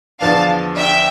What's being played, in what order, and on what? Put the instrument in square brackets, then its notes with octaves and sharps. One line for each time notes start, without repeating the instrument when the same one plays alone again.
[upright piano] E2 D3 F3 B3 D4 [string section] F5 A5
[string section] E5 G5